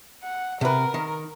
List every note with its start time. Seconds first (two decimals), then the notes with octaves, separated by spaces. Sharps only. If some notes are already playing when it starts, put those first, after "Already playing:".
0.23 F#5
0.61 C3 A#4 B4
0.94 D#3